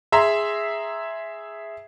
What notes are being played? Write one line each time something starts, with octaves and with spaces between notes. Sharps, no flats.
G#4 E5 A#5 C6